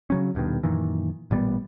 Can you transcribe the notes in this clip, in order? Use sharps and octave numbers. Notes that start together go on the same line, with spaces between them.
C#3 F#3 C#4
D#1 G2 B2 D#3
F#2 A#2 D#3 E3
A1 A#2 G3 B3